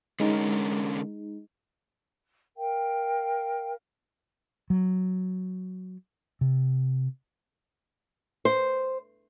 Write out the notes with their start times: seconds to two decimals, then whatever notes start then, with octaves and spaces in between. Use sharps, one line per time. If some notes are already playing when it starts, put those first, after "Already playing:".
0.20 D3 G#3 C#4 D#4 A#4
2.56 A#4 F5 G5
4.70 F#3
6.41 C3
8.45 C5